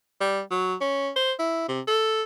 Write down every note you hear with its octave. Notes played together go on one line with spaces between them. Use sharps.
G3
F#3
C#4
C5
E4
C3
A4